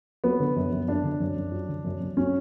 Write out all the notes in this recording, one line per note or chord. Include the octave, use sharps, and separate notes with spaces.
F#3 B3
D3
F#2
F#2
F#3 D4
D3
F#2
F#2
F#3
D3
F#2
F#2
F#3 C#4